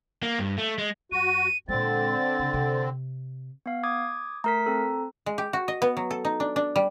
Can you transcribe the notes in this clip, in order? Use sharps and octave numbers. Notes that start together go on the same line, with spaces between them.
A#3
G2
A3
G#3
F#2 F#4 D#7
A#2 D3 G#3 C4 A6
C#3
C3
B3 F5
D6 D#6 G#6
A3 A#4 A#5 B6
C4 A4
G#3
G4
F#4
D#5
B3
F#3
A4
D#4
D4
D4
G3